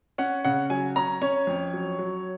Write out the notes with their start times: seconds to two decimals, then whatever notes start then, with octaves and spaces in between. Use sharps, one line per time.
0.18 C#4 F#5
0.44 C#3 F#5
0.70 F#3 G#5
0.96 C#4 A#5
1.22 C#4 C#5
1.47 F2
1.73 F#3
1.99 F#3